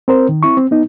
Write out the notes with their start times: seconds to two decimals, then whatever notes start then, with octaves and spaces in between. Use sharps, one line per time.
0.08 C4 A#4 C5
0.29 D#3
0.43 C4 E4 C#6
0.57 C4
0.71 B3 D#4